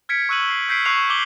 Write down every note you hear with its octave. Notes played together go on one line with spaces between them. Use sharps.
F6 G#6 B6 C#7 D7
C#6 E6 F#6 D#7 F#7
C7
E6 G6 B6 C7 D7
C#6 E6 F#6 C7 F7
D6 F#7 G7